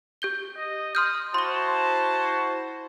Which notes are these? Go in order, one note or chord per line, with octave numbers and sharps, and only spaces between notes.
G4 G6 G7
D#5
C6 D#6 F6 G6
E4 F#4 C5 A5 C6 G7